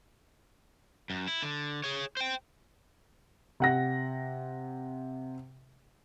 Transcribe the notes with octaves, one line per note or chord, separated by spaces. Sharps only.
F#2
E4
D3
G#4 C#5
C5 G5
C3 F#5 A#6